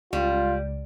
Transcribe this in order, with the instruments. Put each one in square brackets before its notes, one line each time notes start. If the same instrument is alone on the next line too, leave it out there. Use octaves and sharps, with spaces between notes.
[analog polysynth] C#2 [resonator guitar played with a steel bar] G3 [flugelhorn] F4